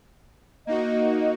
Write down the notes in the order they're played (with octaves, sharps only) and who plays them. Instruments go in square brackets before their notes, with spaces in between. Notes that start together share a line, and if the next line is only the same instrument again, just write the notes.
[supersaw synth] A#3 D#4 F#4 [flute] D#5